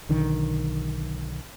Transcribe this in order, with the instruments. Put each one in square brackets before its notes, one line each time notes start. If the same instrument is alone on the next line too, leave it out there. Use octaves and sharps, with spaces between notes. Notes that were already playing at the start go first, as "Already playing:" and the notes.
[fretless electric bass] B1 D3 D#3